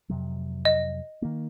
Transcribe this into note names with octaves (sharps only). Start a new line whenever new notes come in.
F2 C3 F#3
D#5
D#3 A#3